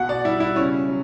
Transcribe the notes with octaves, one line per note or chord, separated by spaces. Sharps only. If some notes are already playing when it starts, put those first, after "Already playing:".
Already playing: B2 F#5
D5
G3 E4
E4
C#3 C#4
F#3